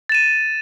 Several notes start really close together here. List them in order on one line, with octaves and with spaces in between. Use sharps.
A6 E7 D#7